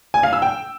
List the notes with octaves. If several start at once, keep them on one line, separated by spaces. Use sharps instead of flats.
G#5
F5
E6
G5